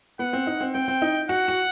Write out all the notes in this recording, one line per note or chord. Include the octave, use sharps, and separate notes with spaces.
B3 F#5
C4
D#4
C4
C4 G5
C4
D#4
F#4 F#5
F#4